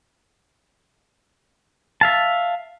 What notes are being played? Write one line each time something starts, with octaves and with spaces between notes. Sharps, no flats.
E5 F5 A5